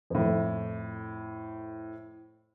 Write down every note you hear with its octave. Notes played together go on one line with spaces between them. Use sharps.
F2 A2